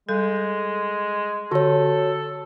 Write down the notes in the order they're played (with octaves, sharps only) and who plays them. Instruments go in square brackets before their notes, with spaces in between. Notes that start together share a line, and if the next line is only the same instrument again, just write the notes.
[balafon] G3 A4 [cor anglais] G#3
[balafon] D3 G4 [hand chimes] F#4 C#5 [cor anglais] A4